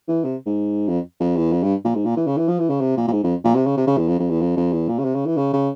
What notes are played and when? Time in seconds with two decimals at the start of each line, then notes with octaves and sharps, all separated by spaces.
0.08 E3
0.25 C3
0.46 G#2
0.88 F2
1.20 F2
1.37 E2
1.52 F2
1.63 G2
1.85 A#2
1.95 G#2
2.05 A#2
2.16 E3
2.27 C#3
2.37 E3
2.48 F3
2.59 E3
2.70 C#3
2.81 C3
2.97 A#2
3.07 A#2
3.12 G#2
3.23 F2
3.44 A#2
3.55 C3
3.66 C#3
3.77 C3
3.87 C#3
3.98 E2
4.08 F2
4.19 F2
4.30 E2
4.41 F2
4.57 F2
4.73 E2
4.88 A#2
4.99 C#3
5.05 C3
5.15 C#3
5.26 E3
5.37 C#3
5.53 C#3